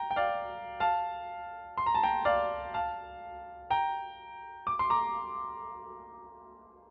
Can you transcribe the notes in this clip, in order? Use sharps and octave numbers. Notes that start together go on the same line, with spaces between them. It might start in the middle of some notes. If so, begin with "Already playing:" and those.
Already playing: G5 A#5
G5
D5 F5
F5 A5
C6
A#5
A5
G5 A#5
D5 F5
F5 A5
G5 A#5
D6
C6
A#5 D6